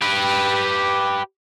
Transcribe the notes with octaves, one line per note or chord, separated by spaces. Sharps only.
G4 B4